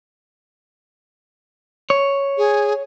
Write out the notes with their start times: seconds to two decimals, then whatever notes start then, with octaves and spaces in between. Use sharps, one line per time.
1.90 C#5
2.38 G#4